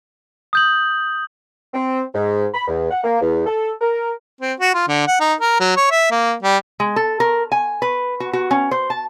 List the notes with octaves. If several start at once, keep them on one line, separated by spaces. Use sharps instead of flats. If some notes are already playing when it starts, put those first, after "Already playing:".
D#6 G6 F#7
C4
G#2
B5
E2
F#5
A#3
E2
A4
A#4
C4
F#4
F4
D3
F#5
D#4
A#4
F#3
C#5
E5
A#3
G3
G#3
A4
A#4
G#5
B4
F#4
F#4
C#4
C5
A5